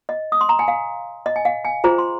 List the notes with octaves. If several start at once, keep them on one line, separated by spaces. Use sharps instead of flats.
D#5
D#6
C6
A#5
G#5
F5
D#5
G#5
F5
G#5
F4 G#4 C5 A#5
C6